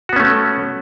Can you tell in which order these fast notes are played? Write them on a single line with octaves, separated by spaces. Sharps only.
F#4 B3 C#4 A3